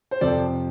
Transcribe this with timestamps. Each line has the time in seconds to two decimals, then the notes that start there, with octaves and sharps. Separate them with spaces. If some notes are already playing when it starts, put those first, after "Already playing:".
0.11 C5
0.21 F2 C3 F3 A4 D5